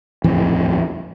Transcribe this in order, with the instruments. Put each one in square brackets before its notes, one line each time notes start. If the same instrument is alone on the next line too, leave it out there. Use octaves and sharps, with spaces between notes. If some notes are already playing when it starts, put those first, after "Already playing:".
[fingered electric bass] D#1 A1 F2 E3